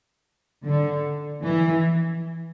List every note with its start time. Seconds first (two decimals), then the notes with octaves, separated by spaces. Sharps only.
0.65 D3
1.45 E3